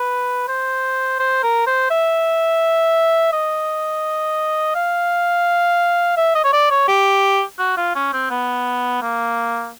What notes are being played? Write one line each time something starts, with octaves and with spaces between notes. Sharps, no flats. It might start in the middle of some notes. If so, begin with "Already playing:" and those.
Already playing: B4
C5
C5
A#4
C5
E5
D#5
F5
E5
D#5
C#5
D5
C#5
G4
F#4
F4
C#4
C4
B3
A#3